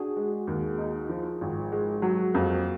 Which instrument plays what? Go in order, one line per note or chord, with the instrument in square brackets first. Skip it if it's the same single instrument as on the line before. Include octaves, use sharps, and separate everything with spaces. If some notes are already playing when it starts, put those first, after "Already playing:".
Already playing: [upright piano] D4 [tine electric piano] F#4 G#4
[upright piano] G#3
D#2
D#4
F3
G#1
G#3
[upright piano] F#3 [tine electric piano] F#4
[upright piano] F2 [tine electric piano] A#3